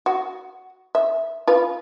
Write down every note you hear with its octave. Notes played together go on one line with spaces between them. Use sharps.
F#4
E5
F4 B4